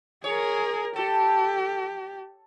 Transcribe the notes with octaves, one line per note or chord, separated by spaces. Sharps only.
G#4 A#4 C#5
G4 A4